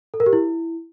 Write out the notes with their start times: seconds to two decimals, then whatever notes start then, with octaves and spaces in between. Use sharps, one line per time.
0.14 A4
0.20 A#4
0.26 G4
0.33 E4